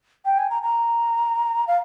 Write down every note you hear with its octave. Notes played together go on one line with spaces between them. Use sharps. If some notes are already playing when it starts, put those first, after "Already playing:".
G5
G#5
A#5
A#5
F5